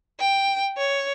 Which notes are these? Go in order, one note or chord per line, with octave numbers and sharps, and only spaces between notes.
G5
C#5